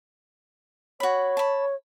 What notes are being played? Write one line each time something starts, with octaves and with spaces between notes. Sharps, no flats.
F#4 C#5 B5
A5 B5